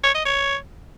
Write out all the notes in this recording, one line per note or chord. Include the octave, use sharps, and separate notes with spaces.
C#5
D#5
C#5